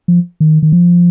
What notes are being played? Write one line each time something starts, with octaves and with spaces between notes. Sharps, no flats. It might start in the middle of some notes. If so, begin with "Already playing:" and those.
F3
D#3
D#3
F3